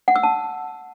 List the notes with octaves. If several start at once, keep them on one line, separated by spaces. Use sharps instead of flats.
F#5
E6
A5